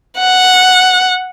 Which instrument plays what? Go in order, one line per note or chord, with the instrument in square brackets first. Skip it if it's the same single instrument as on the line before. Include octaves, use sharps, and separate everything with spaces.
[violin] F#5